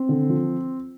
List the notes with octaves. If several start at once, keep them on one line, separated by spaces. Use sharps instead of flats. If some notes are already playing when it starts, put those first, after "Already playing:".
Already playing: C4
D3
F3